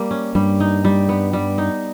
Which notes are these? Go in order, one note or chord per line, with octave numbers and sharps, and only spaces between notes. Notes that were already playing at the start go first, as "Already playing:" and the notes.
Already playing: G3 A#3
C#4
G2 G3
D#4
G3
B3
G3
D#4